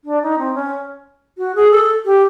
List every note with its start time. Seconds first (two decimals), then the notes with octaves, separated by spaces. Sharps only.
0.04 D4
0.22 D#4
0.38 C4
0.54 C#4
1.38 F#4
1.55 G#4
1.71 A4
2.05 G4